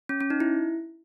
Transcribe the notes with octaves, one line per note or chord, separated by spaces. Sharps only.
C#4
C#4
D#4
E4